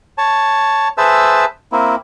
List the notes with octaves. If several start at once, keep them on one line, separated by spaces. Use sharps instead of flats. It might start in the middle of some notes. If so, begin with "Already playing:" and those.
C#5 A5
G#4 B4 C5 E5 A5 E6
A#3 C4 E4